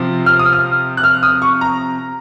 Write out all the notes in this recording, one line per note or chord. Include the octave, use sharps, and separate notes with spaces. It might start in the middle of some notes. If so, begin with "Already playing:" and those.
Already playing: C3 F3 C4 F4
F6
D#6
F6
F#6
F6
D#6
C#6
A#5